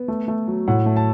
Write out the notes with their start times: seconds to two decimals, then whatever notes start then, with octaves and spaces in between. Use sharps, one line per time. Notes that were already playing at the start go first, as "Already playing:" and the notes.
Already playing: B3
0.08 A3
0.28 A3
0.47 F#3
0.68 A2 F#5
0.86 A3
0.96 A5